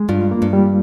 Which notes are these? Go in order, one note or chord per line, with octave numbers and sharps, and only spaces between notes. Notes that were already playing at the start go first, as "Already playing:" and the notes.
Already playing: G#3
G2 F4
A#3
G2
G3